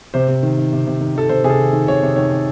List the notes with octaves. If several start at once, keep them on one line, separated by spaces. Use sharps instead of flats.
C3 C5
C3
D#3
D#3
C3
C3
D#3
D#3 A4
C3 C5
C3 G#4
A4
D#3
D#3
C3 C#5
C3
D#3 C#5
D#3